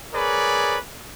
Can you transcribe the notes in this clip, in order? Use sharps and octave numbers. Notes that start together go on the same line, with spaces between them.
G#4 A#4 B4 C#5 D5